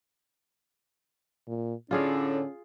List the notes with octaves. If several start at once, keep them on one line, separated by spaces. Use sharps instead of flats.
A#2
A2 D3 C#4 F4 G#4 F5